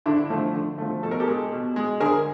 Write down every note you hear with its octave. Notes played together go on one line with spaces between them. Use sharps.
D3 D4 E4
F3 A3
D3
F3 A3
B2 A4
A#4
G4 A4
G#3
B2
G#3
D3 G#4 A#4